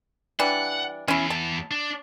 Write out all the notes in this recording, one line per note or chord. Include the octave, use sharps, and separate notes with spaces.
E3 G3 D4 F#5
E2 C#4 E4
A5
D4